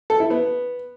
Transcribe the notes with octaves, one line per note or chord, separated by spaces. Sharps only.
A4
E4
B3